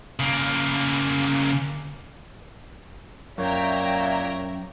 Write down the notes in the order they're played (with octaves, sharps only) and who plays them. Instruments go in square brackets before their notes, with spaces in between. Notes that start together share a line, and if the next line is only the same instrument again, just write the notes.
[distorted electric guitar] C#3 A#3
[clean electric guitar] F#2 [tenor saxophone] A#2 [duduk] C#5 [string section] E5 G5 A#5